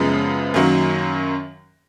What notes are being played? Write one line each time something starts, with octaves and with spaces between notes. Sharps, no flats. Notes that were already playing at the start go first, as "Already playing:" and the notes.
Already playing: F#2 C#3 F3 G#3 B3
F#2 D#3 F#3 A#3